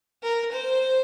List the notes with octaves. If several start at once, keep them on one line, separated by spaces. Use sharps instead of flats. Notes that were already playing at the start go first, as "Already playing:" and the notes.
A#4
C5